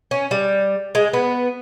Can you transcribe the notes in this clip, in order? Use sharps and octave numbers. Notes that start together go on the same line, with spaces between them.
C#4
G3
G#3
B3